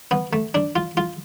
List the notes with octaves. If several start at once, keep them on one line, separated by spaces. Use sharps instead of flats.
B3
A3
D4
F4
F4